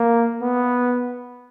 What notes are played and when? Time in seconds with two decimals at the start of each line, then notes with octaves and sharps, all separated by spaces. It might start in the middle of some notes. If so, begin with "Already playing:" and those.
Already playing: A#3
0.42 B3